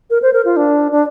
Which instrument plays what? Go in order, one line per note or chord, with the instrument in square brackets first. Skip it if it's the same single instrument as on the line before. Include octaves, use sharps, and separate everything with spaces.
[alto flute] A#4
C5
A#4
F4
D4
D4